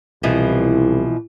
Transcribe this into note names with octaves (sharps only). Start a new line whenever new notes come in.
C2 B2 E3 F3